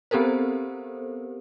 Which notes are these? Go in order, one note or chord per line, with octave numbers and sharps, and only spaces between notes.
B3 C4 G4 A4 A#4 C5